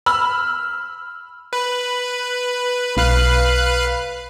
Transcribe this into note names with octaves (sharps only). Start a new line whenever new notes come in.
B5 E6 F6
B4
B1 B4 F5 F#6